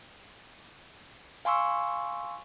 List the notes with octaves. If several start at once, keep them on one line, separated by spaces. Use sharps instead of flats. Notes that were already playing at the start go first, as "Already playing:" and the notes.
F5 G#5 C6 C#6 E6